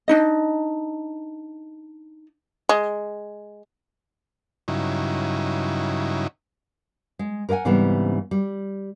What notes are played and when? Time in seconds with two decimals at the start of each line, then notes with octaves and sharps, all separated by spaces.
0.08 D4 D#4 D#5
2.69 G#3
4.68 G2 C#3 F#3 D#4 E4
7.19 G#3
7.49 A#4 B4 D5 F#5 G#5
7.65 G#2 C#3 E3 G3 B3 C4
8.31 G3